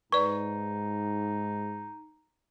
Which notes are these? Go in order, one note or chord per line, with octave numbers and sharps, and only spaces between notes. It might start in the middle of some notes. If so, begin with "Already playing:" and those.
G#2 D#4 B4 D5 C#6